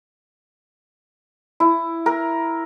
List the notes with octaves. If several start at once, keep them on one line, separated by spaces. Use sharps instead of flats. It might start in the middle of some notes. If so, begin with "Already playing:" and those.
E4
A#4